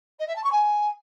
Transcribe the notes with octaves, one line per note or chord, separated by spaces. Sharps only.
D#5
E5
A5
C#6
G#5